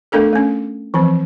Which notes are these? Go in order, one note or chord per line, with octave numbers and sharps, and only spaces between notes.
A3 B3 D4 A4 A#4
A3 C#4
E3 F3 C4